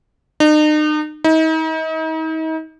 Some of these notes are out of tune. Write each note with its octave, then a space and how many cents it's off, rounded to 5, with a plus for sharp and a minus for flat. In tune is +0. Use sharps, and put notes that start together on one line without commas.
D#4 -40
D#4 +40